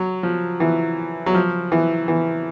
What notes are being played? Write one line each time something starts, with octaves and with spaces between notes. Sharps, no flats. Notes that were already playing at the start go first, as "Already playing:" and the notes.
Already playing: F#3
F3
E3
F#3
F3
E3
E3